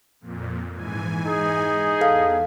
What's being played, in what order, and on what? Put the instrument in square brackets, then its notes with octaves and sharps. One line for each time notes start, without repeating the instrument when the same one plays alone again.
[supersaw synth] F2 A#2
G#2 E3 G#5
[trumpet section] D#4 G#4
[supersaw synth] E2 [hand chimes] A4 F5